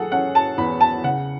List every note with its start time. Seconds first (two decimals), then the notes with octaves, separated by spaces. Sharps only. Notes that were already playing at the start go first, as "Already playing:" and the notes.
Already playing: F#3 G#4 A4 F#5
0.12 C#4 F#5
0.35 A5
0.58 E2 B5
0.81 A5
1.04 C#3 F#5